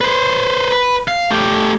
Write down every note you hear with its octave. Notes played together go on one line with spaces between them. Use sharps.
B4 C5
B4
F5
A3 G4